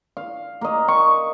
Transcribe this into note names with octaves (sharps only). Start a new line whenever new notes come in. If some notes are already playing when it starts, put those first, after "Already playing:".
F5
A#3 D#5
C#6